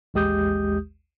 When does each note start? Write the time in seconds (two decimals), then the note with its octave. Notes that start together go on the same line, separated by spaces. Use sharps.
0.14 A1 D#2 G#3 G4 D#6 G6